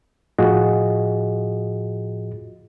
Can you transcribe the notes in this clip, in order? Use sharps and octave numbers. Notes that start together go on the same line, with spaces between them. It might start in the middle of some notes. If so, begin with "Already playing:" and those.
A2 F3 F4 F#4 G#4 D#5